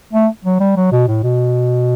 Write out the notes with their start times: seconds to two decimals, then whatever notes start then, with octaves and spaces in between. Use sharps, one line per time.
0.13 A3
0.45 F#3
0.60 G3
0.77 F#3
0.92 B2
1.08 A2
1.23 B2